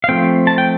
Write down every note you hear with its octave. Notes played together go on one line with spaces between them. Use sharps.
F5
F3 A3 C4 G5
A5
G5